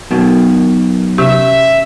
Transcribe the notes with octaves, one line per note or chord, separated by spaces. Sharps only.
F#2 B2 D#3
C3 C#4 G4 E5